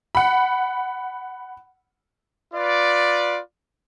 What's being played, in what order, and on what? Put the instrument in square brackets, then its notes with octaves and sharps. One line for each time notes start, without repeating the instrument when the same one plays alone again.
[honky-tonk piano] F#5 B5
[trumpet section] F4 B4 D5